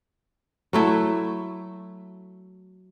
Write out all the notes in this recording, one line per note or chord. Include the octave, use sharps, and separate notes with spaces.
F#3 A3 E4